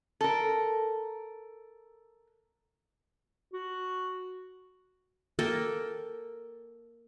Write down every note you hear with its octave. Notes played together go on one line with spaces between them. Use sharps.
A4 A#4
F#4
A#3 A4 A#4 G5